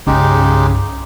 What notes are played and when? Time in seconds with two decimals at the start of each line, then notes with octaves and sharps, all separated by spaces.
0.07 C2 G2 C#3 G#3 D#4 G4